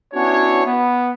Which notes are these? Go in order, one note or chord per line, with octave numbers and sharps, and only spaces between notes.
B3 C#4 D4 E4 F#4 C#5
B3